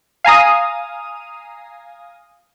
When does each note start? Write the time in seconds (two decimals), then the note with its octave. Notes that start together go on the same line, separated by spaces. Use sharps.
0.24 F5 G#5 A#5 D#6